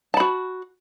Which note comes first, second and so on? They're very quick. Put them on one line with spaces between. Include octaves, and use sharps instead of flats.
A5 B5 F#4